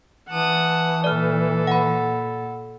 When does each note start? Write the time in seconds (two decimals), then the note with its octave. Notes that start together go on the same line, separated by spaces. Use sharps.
0.30 E3 F#5 A5 D#6
1.04 A#2 A4 D5 F6
1.67 F#5 B5